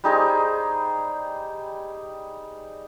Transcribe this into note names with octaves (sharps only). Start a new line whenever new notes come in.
G3 D#4 G#4 C5